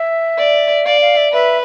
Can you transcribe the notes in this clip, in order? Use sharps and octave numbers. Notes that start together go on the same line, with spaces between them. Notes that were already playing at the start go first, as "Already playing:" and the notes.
Already playing: E5
D5
D5 F5
F5
E5
B4 E5